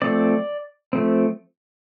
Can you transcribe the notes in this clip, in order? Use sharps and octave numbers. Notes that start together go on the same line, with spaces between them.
F3 A3 C4 D5
F3 A3 C4